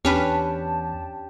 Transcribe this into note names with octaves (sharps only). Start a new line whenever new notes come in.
E2 C#4 D4 G4 B4 A5